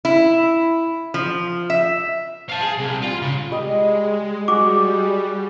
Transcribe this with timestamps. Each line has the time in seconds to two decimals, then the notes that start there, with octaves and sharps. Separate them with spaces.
0.05 E4
1.14 F3
1.70 E5
2.49 F5 A5
2.61 G#4
2.79 C2
3.03 F4
3.22 C#3
3.51 G3 G#3 D#5
4.48 G3 F#4 G#4 D6